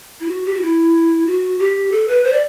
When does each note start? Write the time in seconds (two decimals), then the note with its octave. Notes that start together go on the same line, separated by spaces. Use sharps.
0.20 E4
0.28 F#4
0.45 G4
0.54 F#4
0.62 E4
1.27 F#4
1.59 G4
1.92 A4
2.08 B4
2.24 C5
2.32 D5